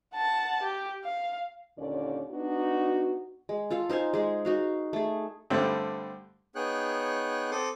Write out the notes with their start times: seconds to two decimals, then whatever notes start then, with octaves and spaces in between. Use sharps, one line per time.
0.15 F#5 A5
0.63 G4
1.05 F5
1.78 D#2 A#2 D3 C#4 D5
2.31 B3 D4 D#4 F#4
3.49 G#3
3.70 F4 A4 F5
3.90 D#4 C5 F5 G#5
4.14 G#3 G#4
4.45 D#4 F#4 F5
4.93 A3 G#4
5.50 G2 D3 G3 A3 C4
6.55 B3 D#4 G#4 C#5 G5 F#6
7.51 C4 A4 C6 D6 D#6